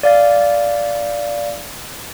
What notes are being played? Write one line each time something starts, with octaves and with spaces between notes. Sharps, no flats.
D5 F5 A6